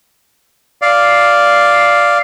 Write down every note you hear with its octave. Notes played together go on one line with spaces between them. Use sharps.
D5 F5